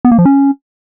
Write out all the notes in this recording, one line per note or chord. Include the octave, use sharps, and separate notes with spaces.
B3
A#3
F3
C#4